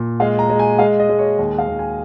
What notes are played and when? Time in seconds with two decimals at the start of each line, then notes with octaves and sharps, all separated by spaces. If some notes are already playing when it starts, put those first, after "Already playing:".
Already playing: A#2
0.20 G#3 F5
0.39 A#5
0.49 G#3
0.59 G#5
0.79 G#3 F5
1.00 D#5
1.09 G#3
1.19 C#5
1.38 D#2 D#5
1.58 F5
1.68 D#2
1.79 G#5